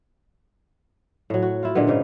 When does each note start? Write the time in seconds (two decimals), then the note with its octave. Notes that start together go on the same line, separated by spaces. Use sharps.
1.30 A2 F#3
1.42 F#4
1.63 E4 F4
1.75 A#2 D3 G#3 B3
1.87 G#2 C#3 D#4